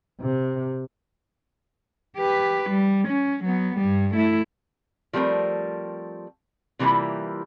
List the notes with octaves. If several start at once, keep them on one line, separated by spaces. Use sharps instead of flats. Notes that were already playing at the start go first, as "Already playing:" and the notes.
C3
G4 B4
G3
C#4
F#3 B3
G2 G3
A3 E4
F3 G3 A3 C4 A#4
C3 E3 G3 A#3 E4 F4